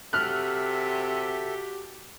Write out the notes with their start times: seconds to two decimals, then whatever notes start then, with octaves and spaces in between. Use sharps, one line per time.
0.13 C3 F#4 G4 A4 E5 F6 F#6